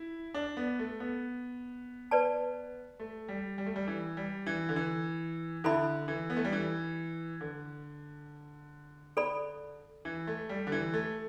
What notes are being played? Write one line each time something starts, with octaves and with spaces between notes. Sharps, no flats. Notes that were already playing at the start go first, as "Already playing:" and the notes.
Already playing: E4
D4
B3
A3
B3
B4 D5 A5
A3
G3
G3
A3
G3
E3
G3
E3
D3
E3
D3 E4 A4 E5 B5
E3
B3
A3
G3
E3
D3
A4 D5 B5
E3
A3
G3
D3
E3
A3